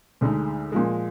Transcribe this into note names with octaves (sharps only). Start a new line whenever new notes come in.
D2 D3 G#3 D#4
A#2 F3 G#3